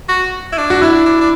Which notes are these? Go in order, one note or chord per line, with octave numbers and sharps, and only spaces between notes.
F#4
E4
D4
F#4
D4 E4
D4
D4